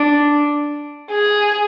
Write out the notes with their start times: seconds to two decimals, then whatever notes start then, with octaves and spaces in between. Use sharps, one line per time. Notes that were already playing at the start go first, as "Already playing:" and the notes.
Already playing: D4
1.11 G#4